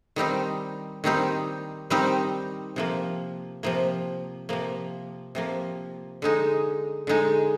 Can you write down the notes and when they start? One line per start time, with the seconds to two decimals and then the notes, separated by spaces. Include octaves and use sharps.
0.16 D#3 G3 C4 D#4 G4
1.04 D#3 G3 C4 D#4 G4
1.90 D#3 G3 C4 D#4 G4
2.76 C3 F3 A#3
3.63 C3 F3 A#3
4.49 C3 F3 A#3
5.35 C3 F3 A#3
6.22 D3 G#3 D#4
7.07 D3 G#3 D#4